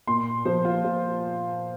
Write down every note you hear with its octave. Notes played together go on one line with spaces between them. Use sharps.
A#2 C6
F3 C5
F4
F3